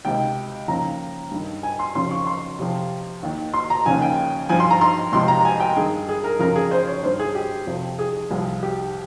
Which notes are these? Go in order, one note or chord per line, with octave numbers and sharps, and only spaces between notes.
C#2 C3 D#3 G5
D#2 C#3 F3 A#5
G2 D#3
G#5
C6
F2 C#3 F3 C6
C#6
C6
F2 C3 F3
D#2 D#3
C6
A#5
D#2 C#3 F3 G#5
G5
G2 F3 G#5
C6
A#5
C6
C#2 C3 F3 C6
A#5
G#5
G5
G2 D#3 G#4
G#4
A#4
F2 C#3 F3 A#4
G#4
C5
C#5
G2 D#3 C5
G#4
G4
F2 C3 F3
G#4
C2 C3 F3
G4